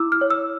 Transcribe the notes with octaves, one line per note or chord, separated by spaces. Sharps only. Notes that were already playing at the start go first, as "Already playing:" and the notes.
Already playing: E4 D6 E6
F6
C#5
E6